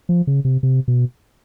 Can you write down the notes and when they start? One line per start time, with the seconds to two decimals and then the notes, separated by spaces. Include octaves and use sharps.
0.09 F3
0.27 C#3
0.45 C3
0.63 C3
0.88 B2